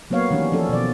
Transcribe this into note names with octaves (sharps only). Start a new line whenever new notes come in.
F#3 A#3 B3 C#5 F5
D#3 E3 G3 C#4
F3 C#4 A4
B2 D#3 D5